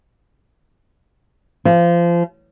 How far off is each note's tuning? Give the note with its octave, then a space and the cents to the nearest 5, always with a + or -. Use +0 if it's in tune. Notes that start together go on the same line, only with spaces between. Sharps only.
F3 -25